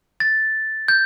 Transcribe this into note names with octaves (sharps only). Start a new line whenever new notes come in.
A6
G6